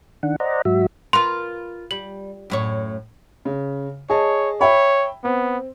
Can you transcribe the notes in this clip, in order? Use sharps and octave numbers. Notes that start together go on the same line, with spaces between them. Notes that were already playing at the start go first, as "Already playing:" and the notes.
D#3 D4 F#5
C5 D5 D#5 F#5 A#5
G#2 F#3 F#4 E5
F4 A#4 B4 C6
G3 F#7
F#2 A2 C#5
C#3
G#4 C#5 D#5 A5
C#5 E5 G5 B5
B3 C4